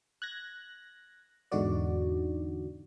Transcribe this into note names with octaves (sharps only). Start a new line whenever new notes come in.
F#6 G#6 A#6
E2 G#2 D3 D#4 F#4 D5